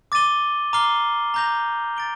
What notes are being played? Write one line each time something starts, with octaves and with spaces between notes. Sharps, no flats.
D6 A6 D#7 G7
A#5 D6 F6 C7 G7
A#5 D6 G6 A#6 F7
A6 D7 G7